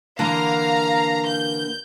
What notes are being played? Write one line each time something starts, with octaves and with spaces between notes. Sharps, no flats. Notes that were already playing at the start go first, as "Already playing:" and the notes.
D3 E3 A#3 F5 A#5
G6